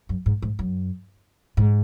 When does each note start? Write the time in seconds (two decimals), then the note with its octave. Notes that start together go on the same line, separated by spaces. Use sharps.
0.09 F#2
0.26 G#2
0.42 G#2
0.59 F#2
1.57 G#2